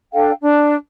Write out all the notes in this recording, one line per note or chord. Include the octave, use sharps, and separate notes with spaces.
D4 A4 F5 G5
D4